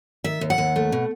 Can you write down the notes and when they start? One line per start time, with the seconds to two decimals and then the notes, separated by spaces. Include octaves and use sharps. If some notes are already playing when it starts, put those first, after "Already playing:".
0.24 D#3 E5
0.41 D#2
0.50 F#5
0.58 D#2
0.76 A3
0.92 B2